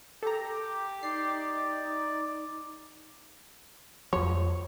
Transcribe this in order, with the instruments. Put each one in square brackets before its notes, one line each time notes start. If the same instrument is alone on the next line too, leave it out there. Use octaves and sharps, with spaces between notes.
[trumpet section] G4 [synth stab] A4 A#5
[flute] D#4 [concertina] D5 [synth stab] C7
[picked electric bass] F2 F3 [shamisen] C#5